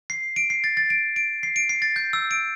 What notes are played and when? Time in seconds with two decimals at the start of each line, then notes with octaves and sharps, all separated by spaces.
0.10 C7
0.36 D7
0.50 C7
0.64 A6
0.77 A6
0.90 D7
1.16 D7
1.43 C7
1.56 D7
1.69 C7
1.82 A6
1.96 G6
2.13 E6
2.31 D7